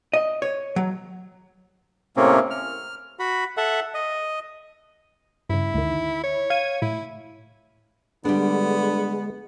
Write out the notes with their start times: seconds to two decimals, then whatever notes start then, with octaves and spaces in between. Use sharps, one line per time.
0.14 D#5
0.42 C#5
0.76 F#3
2.17 A2 C3 A#3 C4 C#4
2.50 F6
3.19 F#4 B5
3.57 A4 E5 F#5
3.94 D#5
5.49 G2 C#3 E4
5.74 D2 D#3
6.23 C#5
6.50 F5 G#6 D#7
6.82 A2 E4
8.25 D3 G3 G#3 B3 D4